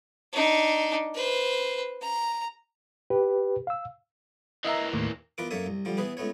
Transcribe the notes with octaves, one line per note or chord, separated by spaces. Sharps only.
D4 D#4
B4 C5
A#5
G4 B4
F5 E6
E3 A#3 D#5 E5 A#5
D#2 A2
E2 F4 A#4 B4 D6
F#2 A#3 A4 C#5 E5 D#6
C2
D3 F3 G3
E3 B3 G#4 B4
C#2 A3 B3 C#5